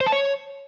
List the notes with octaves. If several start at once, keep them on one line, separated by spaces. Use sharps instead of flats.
C5
A5
C#5